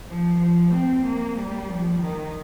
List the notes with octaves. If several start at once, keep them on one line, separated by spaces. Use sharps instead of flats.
F3
F3
C4
A#3
G3
F3
D#3